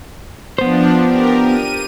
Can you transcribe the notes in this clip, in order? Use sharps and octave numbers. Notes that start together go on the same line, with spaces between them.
F3 B3 D4 C5
G4 A#4
D#7